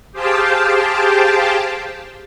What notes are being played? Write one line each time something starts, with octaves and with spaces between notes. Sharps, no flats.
G4 G#4 C5 F5 G5 A5